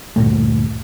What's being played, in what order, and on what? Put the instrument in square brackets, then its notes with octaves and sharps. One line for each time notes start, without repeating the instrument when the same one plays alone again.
[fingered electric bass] D2 G2 A#2 A3